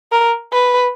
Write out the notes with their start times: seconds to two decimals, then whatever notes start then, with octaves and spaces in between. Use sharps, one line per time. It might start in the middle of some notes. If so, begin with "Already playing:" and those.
0.12 A#4
0.53 B4